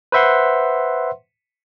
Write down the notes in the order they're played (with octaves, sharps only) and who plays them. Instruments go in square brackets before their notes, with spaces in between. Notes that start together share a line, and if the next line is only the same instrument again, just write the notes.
[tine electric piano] B4 C5 E5 F#5 C6